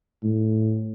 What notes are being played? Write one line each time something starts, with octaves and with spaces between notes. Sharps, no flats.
A2